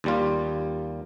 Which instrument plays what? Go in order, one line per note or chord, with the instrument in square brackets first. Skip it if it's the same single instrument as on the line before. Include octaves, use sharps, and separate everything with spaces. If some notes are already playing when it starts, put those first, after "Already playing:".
[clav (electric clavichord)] D#2 G3 F4